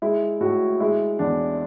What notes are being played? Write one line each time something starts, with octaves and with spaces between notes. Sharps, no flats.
G#3 E4
A2 F#4
G#3 E4
E2 D4